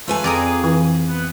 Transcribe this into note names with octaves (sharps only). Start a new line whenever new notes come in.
A3 F4 B4 G#5
F2 G#4 D5 A#5 D#6
E3
B3